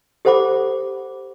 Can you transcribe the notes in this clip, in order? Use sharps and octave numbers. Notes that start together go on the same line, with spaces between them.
G4 A4 C5 F#5 B5 D6